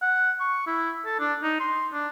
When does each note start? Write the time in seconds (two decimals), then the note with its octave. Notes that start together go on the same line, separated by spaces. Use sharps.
0.02 F#5
0.40 C#6
0.67 E4
1.06 A4
1.20 D4
1.43 D#4
1.60 C6
1.93 D4